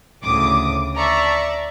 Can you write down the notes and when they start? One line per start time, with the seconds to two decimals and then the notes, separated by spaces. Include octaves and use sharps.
0.23 D2 A2 C#3 D6 D#6
0.97 D5 E5 A5 A#5 C#6